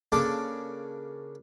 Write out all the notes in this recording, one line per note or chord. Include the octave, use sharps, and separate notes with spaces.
C#3 A#3 D4 A4 D5 D6